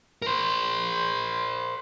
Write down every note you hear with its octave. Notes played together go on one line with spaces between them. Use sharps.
A#4 C5